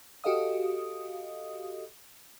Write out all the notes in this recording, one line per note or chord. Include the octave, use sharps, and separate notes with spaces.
F#4 G4 A4 D#5 F5 D#6